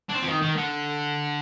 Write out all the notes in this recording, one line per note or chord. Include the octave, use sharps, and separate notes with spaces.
D4
C4
F3
D#3
D#3
D3